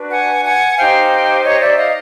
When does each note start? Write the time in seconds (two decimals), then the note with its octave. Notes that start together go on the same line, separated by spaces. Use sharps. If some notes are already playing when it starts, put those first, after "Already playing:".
Already playing: D4 F#4 B4
0.12 F#5 G#5
0.45 F#5 G#5
0.78 D#4 G4 C5 F5 G5
1.44 C#5 D#5
1.61 D5 E5
1.77 D#5 F5